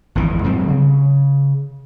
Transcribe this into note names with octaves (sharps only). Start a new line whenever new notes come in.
G#1 F2 E3
G#2 F#3 G3 C4
C#3